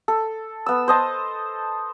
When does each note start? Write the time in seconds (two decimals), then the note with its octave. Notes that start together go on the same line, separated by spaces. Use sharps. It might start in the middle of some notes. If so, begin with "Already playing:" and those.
0.08 A4
0.66 B3 E6
0.88 C5 D#5 A5